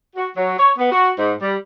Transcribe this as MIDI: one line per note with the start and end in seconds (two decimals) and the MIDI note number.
0.16 0.28 66
0.36 0.53 54
0.59 0.72 73
0.78 0.91 59
0.92 1.11 66
1.19 1.34 44
1.42 1.55 55